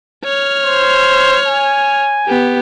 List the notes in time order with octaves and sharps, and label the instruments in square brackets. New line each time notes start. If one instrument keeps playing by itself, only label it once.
[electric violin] C#5 F6
[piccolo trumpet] C5
G#5
[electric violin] B3 G4